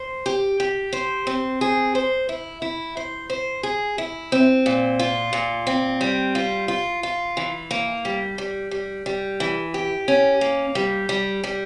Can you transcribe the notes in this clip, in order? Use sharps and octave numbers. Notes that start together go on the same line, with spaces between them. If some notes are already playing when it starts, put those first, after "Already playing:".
Already playing: C5
G4
G4
C5
C4
G#4
C5
E4
E4
C5
C5
G#4
E4
C4
A#2
F4
A#2
C4
G3
F4
F4
F4
E3
A#3
G3
G3
G3
G3
E3
G4
C#4
A#3
G3
G3
G3